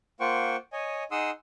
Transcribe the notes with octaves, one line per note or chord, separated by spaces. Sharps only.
A#3 F4 C5 F#5 G5 C#6
C#5 D#5 G#5
D#4 G#4 F#5 C6 D#6 E6